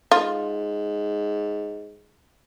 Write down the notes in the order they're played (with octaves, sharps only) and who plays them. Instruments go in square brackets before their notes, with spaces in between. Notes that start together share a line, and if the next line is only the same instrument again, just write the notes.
[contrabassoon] G#2 [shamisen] F4